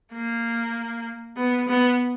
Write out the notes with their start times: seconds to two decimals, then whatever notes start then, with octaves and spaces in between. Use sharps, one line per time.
0.13 A#3
1.37 B3
1.68 B3